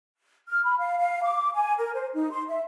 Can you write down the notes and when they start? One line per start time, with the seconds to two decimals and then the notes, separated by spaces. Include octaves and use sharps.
0.48 F6
0.65 B5
0.79 F5
0.99 F5
1.23 D6
1.54 G#5
1.78 A#4
1.94 C5
2.14 D#4
2.31 C6
2.49 E5